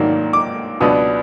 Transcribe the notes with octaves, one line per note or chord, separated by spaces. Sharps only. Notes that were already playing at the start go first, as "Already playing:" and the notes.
Already playing: G#2 D#3 F#3 A#3 D4
D6
C#2 B2 F#3 B3 D4 D#6